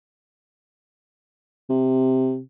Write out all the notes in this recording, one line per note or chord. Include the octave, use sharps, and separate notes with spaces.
C3